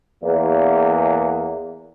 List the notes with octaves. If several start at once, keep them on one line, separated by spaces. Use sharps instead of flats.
E2 A#3